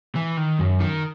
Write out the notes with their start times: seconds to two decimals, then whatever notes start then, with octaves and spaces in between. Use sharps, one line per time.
0.15 E3
0.37 D#3
0.59 F#2
0.81 D#3